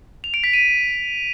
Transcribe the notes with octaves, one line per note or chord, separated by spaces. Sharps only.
F7
D7
B6
D#7